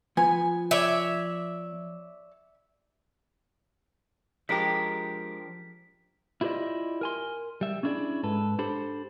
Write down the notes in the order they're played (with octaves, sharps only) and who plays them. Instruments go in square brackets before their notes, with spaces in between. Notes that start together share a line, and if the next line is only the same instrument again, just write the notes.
[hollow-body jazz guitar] F3 B3 [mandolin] G#5
[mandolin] C#5 D5 [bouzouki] E5
[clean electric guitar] F3 D4 A#4 [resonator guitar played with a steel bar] G#3 G4 [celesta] B6
[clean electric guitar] E4 F4 G4 B4 D5 D#5
A#4 G#5 C6
G3 E5
C#4 D4 E4 G#4 D5
G#2 A4 B4
D4 G4 A4 C5 B5